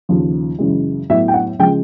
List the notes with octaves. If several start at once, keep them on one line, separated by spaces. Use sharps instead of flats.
D#2 C#3 F3
F#2 C#3 E3 G#3
A2 F#3 B3 E5
G5
F#5
C#3 F3 G#3 G5